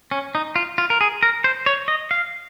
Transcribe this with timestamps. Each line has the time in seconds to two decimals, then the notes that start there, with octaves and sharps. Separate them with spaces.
0.11 C#4
0.35 D#4
0.56 F4
0.78 F4
0.90 A#4
1.01 G#4
1.23 A#4
1.44 C5
1.66 C#5
1.88 D#5
2.11 F5